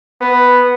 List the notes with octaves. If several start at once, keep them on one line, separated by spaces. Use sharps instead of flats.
B3